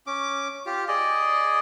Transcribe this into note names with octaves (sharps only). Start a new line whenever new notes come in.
C#4 D6
F4 G4
G#4 D5 D#5